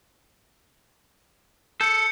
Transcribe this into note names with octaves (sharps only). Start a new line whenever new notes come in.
A4 G6 C#7